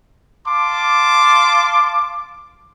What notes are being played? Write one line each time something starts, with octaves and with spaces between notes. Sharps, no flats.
F5 A5 C6 D6